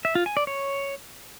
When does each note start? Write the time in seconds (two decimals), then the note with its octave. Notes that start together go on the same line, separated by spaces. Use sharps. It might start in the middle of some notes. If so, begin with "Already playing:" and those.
0.05 E5
0.15 F4
0.26 G#5
0.37 D5
0.47 C#5